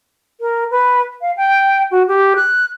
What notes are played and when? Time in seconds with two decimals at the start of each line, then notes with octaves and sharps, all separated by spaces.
0.40 A#4
0.71 B4
1.21 F5
1.36 G5
1.91 F#4
2.07 G4
2.35 F#6